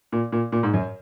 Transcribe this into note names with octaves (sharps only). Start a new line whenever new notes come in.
A#2
A#2
A#2
G#2
F#2